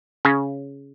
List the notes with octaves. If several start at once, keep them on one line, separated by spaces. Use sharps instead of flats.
C#3 C#4